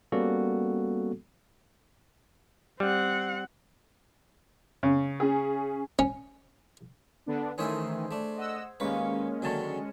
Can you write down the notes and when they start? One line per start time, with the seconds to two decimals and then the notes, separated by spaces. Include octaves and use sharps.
0.12 G3 A#3 B3 C#4 F#4 A4
2.80 G3 C4 F#5
4.83 C#3
5.20 C#4 G#4
5.99 C#4
7.26 D3 B3 D4
7.58 D#3 E3 A3 C#4 G#4 C5 C#5 E5
8.11 A3 D4
8.36 D#5 F#5 E6
8.80 D#2 A#2 G#3 A#3 C#4 B4 C#6
9.42 D3 D#3 F#3 G#5 A5 C#6